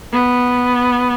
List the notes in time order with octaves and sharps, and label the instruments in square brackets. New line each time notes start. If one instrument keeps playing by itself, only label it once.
[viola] B3